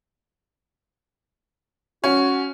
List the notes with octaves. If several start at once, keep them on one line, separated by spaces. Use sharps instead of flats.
C#4 F#4